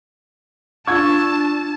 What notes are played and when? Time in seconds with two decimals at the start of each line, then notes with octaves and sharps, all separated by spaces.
0.87 D4 F4 A5 C#6 E6 G#6